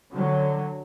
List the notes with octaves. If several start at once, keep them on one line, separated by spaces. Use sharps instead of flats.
D3 F#3